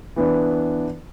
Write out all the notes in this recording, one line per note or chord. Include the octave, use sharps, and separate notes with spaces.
E3 B3 D4